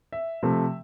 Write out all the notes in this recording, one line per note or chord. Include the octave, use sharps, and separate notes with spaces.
E5
C3 F3 A3